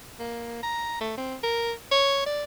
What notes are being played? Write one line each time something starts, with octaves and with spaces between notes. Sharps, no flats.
A#3
A#5
A3
C4
A#4
C#5
D5